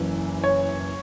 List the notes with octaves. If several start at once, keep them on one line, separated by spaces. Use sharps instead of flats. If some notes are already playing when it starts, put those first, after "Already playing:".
Already playing: F#1 F#2 E3
C#5